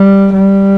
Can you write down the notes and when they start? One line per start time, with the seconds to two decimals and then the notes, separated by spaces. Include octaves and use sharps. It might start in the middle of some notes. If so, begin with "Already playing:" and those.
Already playing: G3
0.34 G3